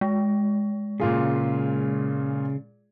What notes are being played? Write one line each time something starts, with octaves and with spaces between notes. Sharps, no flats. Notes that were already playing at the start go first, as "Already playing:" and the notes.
G#3
A#2 C#3 F4 G#4